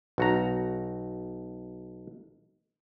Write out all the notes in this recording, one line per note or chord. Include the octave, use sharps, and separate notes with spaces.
B1 F#4 A#5